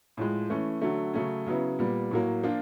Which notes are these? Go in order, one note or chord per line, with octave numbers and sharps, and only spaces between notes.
A2 F3 G#3
E3 A3 C#4
D3 F#3 A3
C#3 F#3 A3 C#4
C#3 F#3 B3 E4
A#2 G3 B3
A2 F#3 A#3
F3 A#3 D4 F4